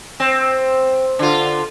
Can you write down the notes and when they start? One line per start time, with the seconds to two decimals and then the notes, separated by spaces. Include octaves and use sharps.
0.20 C4
1.19 D3 F4